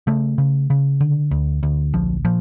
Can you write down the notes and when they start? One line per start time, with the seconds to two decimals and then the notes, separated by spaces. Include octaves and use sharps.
0.07 C#3 A3
0.38 C#3
0.70 C#3
1.00 D3
1.31 D2
1.63 D2
1.93 A#1 F3
2.25 A#2 F3